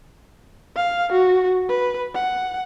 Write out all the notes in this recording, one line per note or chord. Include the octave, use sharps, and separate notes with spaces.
F5
F#4
B4
F#5